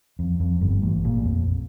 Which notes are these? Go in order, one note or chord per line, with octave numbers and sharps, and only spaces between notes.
F2
F2
G1 G2
A1 A2
A#1 A#2
F2 F3